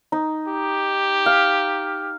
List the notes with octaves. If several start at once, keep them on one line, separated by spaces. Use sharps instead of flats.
D#4
G4
F5